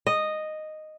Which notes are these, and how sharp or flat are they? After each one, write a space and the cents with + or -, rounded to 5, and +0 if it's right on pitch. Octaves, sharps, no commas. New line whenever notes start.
D#5 -5